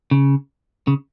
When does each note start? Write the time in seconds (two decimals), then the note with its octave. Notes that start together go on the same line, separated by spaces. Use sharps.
0.11 C#3
0.87 C#3